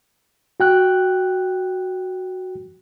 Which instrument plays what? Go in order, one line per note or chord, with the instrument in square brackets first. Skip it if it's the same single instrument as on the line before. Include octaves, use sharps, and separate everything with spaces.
[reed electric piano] F#4 G5 F#6